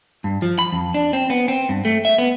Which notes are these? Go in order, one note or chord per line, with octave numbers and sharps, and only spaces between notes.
G2
F3
B5
F2
D4
C4
B3
C4
G2
A3
E5
B3